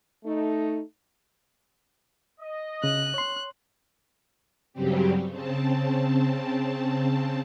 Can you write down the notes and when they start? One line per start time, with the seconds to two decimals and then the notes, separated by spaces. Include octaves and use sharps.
0.25 A3 D#4
2.40 D#5
2.84 C#3 F#6
3.14 C#5 C6
4.73 G2 C#3 F#3 G3 C4 G4
5.29 C#3 C4 A5